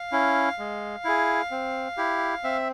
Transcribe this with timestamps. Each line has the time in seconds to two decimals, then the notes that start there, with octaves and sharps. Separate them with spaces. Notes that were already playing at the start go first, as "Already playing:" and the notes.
Already playing: F5
0.12 C#4 E4
0.59 G#3
1.05 E4 G#4
1.51 C4
1.97 E4 G4
2.44 C4 E5